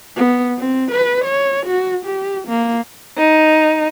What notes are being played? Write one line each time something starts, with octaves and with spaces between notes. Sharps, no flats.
B3
C4
B4
C#5
F#4
G4
A#3
D#4